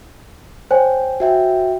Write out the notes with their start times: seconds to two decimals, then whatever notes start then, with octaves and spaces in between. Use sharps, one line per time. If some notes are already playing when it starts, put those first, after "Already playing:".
0.71 C5 C#5 G5 G#5
1.20 F#4 E5 G5